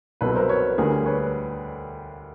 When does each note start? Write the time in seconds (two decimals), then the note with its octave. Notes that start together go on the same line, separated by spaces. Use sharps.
0.21 C2 B2 F#3 A4 B4
0.35 A#4 C5
0.49 B4 C#5
0.78 D2 D3 G3 G#4 A#4
1.06 B4 C#5